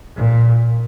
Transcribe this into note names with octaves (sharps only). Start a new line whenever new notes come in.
A#2